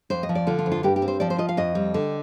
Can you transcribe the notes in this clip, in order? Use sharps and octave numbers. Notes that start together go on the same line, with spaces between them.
F2 C5
D#5
F3
D5
D3 F4
F4
F2
F4
G2 G4
G4
C4
C5
F3 D5
C5
F4 D#5
F5
F2 D#5
G3
D3